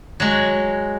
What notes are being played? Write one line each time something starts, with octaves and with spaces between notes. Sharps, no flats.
F#3 G#3